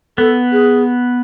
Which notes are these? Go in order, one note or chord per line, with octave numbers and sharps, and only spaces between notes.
B3 A4
G#4